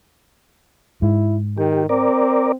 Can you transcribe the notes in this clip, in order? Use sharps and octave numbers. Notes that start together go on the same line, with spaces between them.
G#2 E4
D#3 G4
C4 A#4 D5